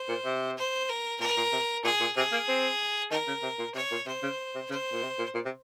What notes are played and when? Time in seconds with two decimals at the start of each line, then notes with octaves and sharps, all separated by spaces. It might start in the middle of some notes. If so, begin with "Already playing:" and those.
Already playing: C5
0.09 A#2
0.25 C3
0.57 C5
0.89 A#4
1.20 A#2 A#4
1.37 A#2
1.52 C3
1.84 A#2 G#4
2.00 A#2
2.16 C3 G#4
2.32 A#3
2.48 C4
3.11 D#3 A#4
3.27 C#3
3.43 C3
3.59 A#2
3.74 C3 C#5
3.91 A#2
4.06 C3 C5
4.23 C#3
4.55 C3
4.70 C#3 C5
4.92 A#2
5.03 C3
5.19 A#2
5.34 A#2
5.45 C3